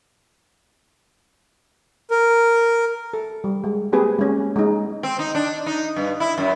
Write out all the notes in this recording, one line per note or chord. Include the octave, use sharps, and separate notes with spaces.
A#4
A4
G3
G#3
A#3 C4 G4 G#4 B4
G#3 C#4
G#3 D#4
C4
D#4
D4
D#4
G2
E4
F#2